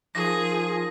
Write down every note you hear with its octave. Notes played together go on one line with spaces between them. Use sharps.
F3 D#4 G#4 A#4 A#6